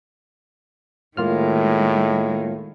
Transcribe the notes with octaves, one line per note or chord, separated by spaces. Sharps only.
A2 D#3 G#3 A#3 F4 F6